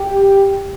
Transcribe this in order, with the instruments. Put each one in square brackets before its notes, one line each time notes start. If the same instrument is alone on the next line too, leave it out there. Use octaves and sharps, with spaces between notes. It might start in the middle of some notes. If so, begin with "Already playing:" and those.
Already playing: [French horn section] G4